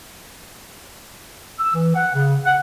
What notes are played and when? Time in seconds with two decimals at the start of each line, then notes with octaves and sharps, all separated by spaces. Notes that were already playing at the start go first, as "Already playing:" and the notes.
1.59 E6
1.75 E3
1.95 F#5
2.14 C#3
2.45 F#5